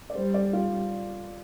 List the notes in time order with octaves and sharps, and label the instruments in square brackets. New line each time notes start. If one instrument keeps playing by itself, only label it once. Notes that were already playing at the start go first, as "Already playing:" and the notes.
[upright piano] D5
[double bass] G3 [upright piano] C5
[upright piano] D5
F4